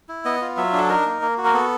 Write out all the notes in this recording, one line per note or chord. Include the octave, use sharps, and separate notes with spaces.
E4
B3 D#5
F4
F#3 E5
D4 A4
D#4 A#4
A#3
A#3
F#4
A#4
B3 A4